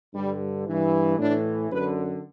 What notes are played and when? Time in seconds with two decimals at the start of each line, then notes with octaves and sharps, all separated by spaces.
0.13 G2 D3 G3
0.66 G2 E3
1.17 A2 E3 D4
1.70 F#2 D3 B4